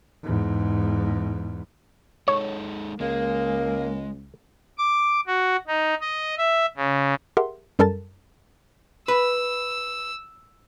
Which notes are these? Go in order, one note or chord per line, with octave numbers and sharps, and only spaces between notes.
E2 G#2
G#3 D#4 A4 C#5
C#2 G#3 A#3
D6
F#4
D#4
D#5
E5
C#3
G4 G#4 A#4 E5 F#5 C6
F#2 G3 A4 A#4 A5 A6
B4 E6